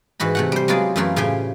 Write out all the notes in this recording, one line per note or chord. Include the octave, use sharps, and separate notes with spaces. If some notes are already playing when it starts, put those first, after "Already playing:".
G#2 E3 F#4 B5
C3 A3 F#5
G3 C5
F#3 G#3 B3 F4 G#4 D5
F#2 E3 A3 E4 F4 A#4
A2 C#3 G4 C5 G5 G#5